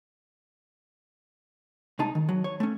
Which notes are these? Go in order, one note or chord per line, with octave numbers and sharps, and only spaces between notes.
C2 G#3 D#4 A5
D#3
F#3
C#5
A3 C#4